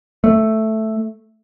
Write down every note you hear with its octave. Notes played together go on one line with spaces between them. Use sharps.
A3